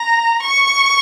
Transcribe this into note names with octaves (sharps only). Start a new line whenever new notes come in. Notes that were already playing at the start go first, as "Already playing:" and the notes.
Already playing: A#5
C#6